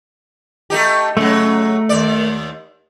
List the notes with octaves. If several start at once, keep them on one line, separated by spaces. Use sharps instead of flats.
A3 D#4 G4
C#3 F#3 A3
D#2 D5